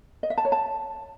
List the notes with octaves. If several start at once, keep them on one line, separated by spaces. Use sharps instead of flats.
D#5
E5
A5
C#5
A5